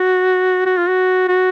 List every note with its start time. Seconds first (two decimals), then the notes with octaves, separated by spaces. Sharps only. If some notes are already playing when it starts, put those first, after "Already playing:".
Already playing: F#4
0.66 F#4
0.77 F4
0.88 F#4
1.28 F#4